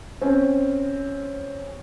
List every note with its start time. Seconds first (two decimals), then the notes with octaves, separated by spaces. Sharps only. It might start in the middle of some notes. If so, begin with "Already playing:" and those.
0.21 C4 C#4